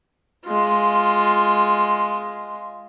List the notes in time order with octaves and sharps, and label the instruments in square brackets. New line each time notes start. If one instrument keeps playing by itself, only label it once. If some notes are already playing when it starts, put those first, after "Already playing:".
[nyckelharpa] G#3 F4